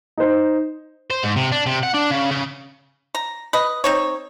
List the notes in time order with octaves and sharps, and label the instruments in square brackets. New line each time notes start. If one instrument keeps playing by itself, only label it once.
[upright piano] D#4 C5
[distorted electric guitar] C5
G#2
C3
D4
C3
F#5
D4
C#3
C#3
[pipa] A#5
B4 D#5
C4 D#4 C#5